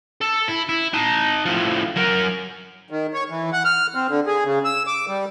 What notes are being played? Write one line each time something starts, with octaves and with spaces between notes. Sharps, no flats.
A4
E4
E4
D#4 A5
A2 F3
F#3 A#4
D#3
C#5
E3
F#5
F6
C4
D3
G#4
C#3
E6
D6
G3